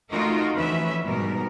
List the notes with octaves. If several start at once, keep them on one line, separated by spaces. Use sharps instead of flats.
A3 D#4 F4 F#4 A#4
D2 E3 F3 C#4 B4 E5
G#2 B2 G3 B3 A#4